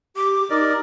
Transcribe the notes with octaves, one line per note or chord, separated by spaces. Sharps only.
G4 D6
D#4 A#4 D5 D#5